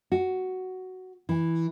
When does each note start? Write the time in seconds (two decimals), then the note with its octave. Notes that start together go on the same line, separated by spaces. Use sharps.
0.12 F#4
1.29 E3